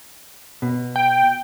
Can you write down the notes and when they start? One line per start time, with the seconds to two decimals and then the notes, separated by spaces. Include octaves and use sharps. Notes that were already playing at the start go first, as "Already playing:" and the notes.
0.62 B2
0.96 G5